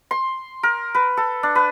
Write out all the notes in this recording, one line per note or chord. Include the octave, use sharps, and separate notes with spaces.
C6
A#4
B4
A4
D4
B4